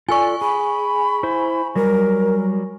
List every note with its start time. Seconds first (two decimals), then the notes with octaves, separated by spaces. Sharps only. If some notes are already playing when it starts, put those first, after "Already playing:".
0.09 F4 A4 D5 G#5 C#6
0.41 G#4 B5
1.23 E4 C5
1.76 F#3 G3 A#4